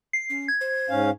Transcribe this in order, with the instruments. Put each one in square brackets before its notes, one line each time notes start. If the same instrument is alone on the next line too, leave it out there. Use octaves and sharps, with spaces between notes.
[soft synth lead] C7
[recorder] C#4
[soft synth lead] G#6
[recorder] C5
[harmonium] G#2 C#4 F5